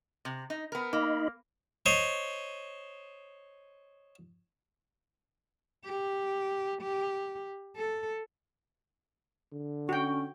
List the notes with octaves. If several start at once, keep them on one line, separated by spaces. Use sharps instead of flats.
C3
D#4
B3 A#4
A#3 D#4 D#5 B5
C5 C#5 D#5
G4
G4
A4
D3
C#4 F#4 G5 C#6